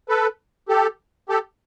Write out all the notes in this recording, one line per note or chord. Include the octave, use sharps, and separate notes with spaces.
A4 B4
G4 A4
G4 A4